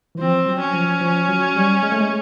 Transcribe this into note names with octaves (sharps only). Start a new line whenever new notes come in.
E3
F3 C4
F#3
C#4
F3
F3
F#3
G3
G#3
A3
G#3